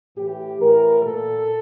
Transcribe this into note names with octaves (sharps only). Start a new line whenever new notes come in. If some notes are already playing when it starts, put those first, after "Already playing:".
A2 E3 G4
A2 E3 A#4
A#2 A4